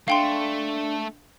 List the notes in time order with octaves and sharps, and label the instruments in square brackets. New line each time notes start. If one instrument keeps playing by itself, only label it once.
[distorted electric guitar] A3 [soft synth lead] D4 [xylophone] F5 G5 C6